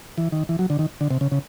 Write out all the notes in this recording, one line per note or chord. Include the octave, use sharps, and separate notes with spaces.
E3
D#3
E3
F#3
D3
D#3
D3
C3
C#3
C#3